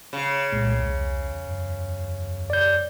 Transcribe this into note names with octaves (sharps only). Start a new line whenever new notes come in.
C#3
C2 A#2 G#3
E2
F#2
D5 G6